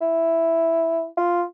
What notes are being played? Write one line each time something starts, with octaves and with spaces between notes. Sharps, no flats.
E4
F4